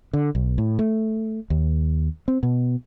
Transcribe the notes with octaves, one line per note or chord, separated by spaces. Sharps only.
D3
B1
A2
A3
D#2
C4
B2